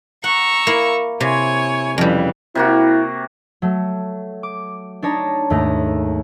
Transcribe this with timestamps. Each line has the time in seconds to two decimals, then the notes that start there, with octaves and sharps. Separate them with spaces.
0.24 F#5 A#5 C#6 E6
0.67 A#3 E4
1.20 C3 E4 C#5 G#5
1.98 F2 C#3 E3 G3
2.55 C3 A#3 E4 F#4
3.62 F#3 A3
4.43 D6
5.02 D4 D#4 C#5 A5 A#5
5.50 D#2 G#2 A3 A#5